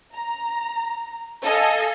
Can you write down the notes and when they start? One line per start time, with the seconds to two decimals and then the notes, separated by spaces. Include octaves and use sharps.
0.14 A#5
1.44 A4 D#5 F5 G#5